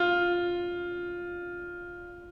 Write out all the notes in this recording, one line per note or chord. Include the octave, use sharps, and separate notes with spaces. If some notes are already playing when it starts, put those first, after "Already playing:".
Already playing: F4